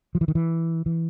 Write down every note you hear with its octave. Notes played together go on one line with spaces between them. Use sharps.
F3
E3
D#3
E3
E3